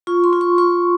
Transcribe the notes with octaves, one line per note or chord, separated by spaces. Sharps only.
F4 C#6
C6
F4
C#6
F4 C#6